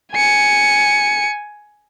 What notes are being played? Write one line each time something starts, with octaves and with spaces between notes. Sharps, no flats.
G#5 C#7